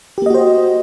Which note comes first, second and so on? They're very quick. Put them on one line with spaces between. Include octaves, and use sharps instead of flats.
G4 A#3 D#5 F#4 C5